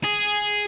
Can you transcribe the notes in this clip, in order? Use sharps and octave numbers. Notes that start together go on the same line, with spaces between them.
G#4